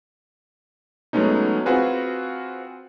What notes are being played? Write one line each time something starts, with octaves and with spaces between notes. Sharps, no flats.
F#3 G#3 A3 B3 C#4 D#4
C4 F4 F#4 G#4 B4